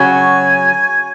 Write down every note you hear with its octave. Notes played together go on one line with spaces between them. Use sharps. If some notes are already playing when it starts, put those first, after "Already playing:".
Already playing: C#3 F#3 C#4 F#4 G#5